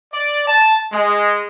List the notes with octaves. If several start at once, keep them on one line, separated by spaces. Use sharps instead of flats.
D5
A5
G#3